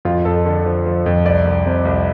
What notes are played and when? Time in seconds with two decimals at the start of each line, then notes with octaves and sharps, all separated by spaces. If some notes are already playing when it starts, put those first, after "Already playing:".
0.05 F2 F4
0.25 F2 A4
0.45 D3 A4
0.66 F3
0.86 F3
1.06 F2
1.25 C2 D5
1.45 C2
1.66 C3
1.85 C2